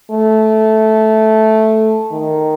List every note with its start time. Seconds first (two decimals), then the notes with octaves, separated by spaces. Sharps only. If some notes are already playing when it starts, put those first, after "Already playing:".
0.11 A3
2.12 D#3